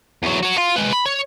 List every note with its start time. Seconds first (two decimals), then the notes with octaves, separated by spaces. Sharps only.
0.23 E2 F#3
0.43 F#4 C#5
0.58 F5 C6
0.76 G#3 B4
0.93 B5
1.06 C#5